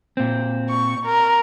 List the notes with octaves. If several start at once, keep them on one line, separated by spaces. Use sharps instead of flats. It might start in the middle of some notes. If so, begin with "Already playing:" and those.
A#2 C4
C#6
A#4